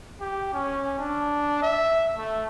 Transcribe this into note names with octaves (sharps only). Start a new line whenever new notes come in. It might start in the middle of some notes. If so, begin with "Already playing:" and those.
G4
C#4
D4
E5
A3